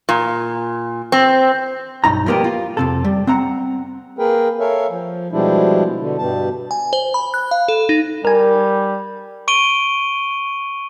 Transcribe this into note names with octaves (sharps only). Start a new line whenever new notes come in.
A#2
C4
B1 G2 D#4 A#5
F3 G3 A#3 B3 G4
F4
F2 C3 A4
G3
C4 F#5 A#5
A#3 G#4 A#4 B4 G5
A4 A#4 C#5 E5 F5 G#5
F3
B2 F3 G3 G#3 D4 E4
B2 D3
G2 B2 G3 A5
G#5
C5
B5
F#6
F5
A4
D#4
G3 A#4 G#5
C#6 D7 D#7 G7